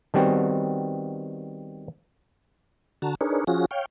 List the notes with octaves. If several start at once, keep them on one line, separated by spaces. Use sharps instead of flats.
D#3 G3 B3 C4 F#4
D3 F#4 A5 A#5
D4 D#4 G#4 A#4 B4 C#5
F3 C#4 F4 F#4 G#4 A#6
C#5 F5 G5